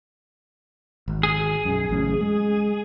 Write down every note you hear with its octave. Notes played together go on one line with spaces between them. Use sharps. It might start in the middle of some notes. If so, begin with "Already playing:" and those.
G#1
G#4
B1 F#2
A1 F#2 C#3
G#3